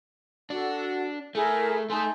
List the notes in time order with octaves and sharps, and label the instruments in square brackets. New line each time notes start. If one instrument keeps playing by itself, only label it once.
[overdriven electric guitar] D4 [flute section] F#4 A4 F#5
[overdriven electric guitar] A3 [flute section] E4 G#4 A#4
[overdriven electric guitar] A3 A4 [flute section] D#4 G#5 C6